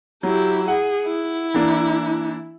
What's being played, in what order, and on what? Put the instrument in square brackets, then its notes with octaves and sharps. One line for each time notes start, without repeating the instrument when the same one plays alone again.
[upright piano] F#3 [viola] E4 G4
[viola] G#4 [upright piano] F#5
[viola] E4
[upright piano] E3 A#3 D4